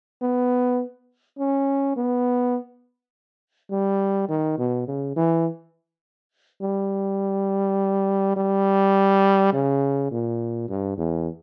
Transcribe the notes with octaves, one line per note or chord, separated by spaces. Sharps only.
B3
C#4
B3
G3
D#3
B2
C#3
E3
G3
G3
C#3
A#2
G2
E2